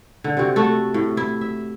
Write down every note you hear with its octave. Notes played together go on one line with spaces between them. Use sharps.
D3
C3 C4 F#4
A3 F#4 A4
A2
E4
E5